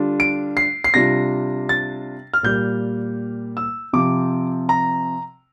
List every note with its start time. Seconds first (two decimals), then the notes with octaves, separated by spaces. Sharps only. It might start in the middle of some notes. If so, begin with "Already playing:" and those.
Already playing: D3 G3 D4 F4
0.20 D7
0.57 C7
0.84 C7
0.94 C3 G3 D4 F4 A#6
1.69 A6
2.34 F6
2.43 A#2 G3 A#3 G6
3.57 E6
3.93 C3 F3 C4 D6
4.69 A#5